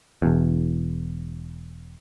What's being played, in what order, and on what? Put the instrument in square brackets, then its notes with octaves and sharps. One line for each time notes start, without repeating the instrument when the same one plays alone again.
[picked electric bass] E1 E2